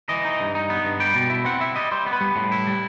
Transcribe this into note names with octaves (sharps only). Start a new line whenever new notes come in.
E3 D#5
D#4
G2
D#4
B3
G2
G3 G5
B2
E4
C4 F#5
E4 E5
G3 D#5
G3 C5
B3
B4
G3
A2
E4
G3